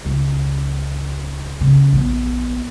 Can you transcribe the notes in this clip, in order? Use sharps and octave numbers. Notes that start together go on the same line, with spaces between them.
C#2
C#3
A#1 B3